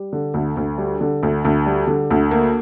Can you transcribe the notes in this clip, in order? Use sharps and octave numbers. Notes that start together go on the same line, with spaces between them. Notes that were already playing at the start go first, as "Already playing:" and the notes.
Already playing: G3
D3
D2
D2
G3
D3
D2
D2
G3
D3
D2
A#3